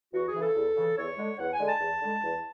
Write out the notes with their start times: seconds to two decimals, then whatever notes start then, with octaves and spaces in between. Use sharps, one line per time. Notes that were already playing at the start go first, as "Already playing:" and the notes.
0.13 E2 F#4
0.27 G#4
0.34 C#3 E3
0.41 A4
0.55 E2
0.76 C#3 E3
0.97 E2 C#5
1.18 D3 G#3
1.38 E2 F#5
1.52 G#5
1.59 D3 G#3
1.67 A5
1.80 E2
2.02 D3 G#3
2.22 E2